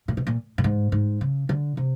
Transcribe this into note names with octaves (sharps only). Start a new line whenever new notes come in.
A#2
B2
A#2
A2
G#2
G#2
C#3
D3
C3